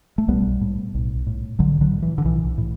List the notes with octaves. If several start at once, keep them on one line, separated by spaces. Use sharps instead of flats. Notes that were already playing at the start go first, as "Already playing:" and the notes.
A3
B1 G3 B3
A2
B1
A2
B1 D3 F#3
D3 F#3
A2
E3
D3
B1 E3
A2